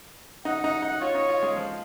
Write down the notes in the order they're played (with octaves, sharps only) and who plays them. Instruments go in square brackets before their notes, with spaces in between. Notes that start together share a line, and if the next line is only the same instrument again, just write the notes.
[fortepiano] D#4 [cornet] F#5
[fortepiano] D#4
D#4
[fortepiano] F4 [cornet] C#5
[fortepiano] D#4
F4
G#3
F3